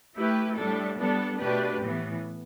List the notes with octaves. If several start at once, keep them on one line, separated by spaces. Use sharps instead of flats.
A3 E4 G4 B4
A2 G3 D4 A4
G3 B3 D4 A4
B2 A3 D4 G4 B4
A2 E3 B3